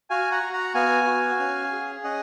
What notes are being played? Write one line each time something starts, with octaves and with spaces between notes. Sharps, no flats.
F#4 F5 G#5
F#5 A#5
F#4
F#5 A#5
B3 F5 G#5
F#4
C#4
G#4
C#4 D#5 F#5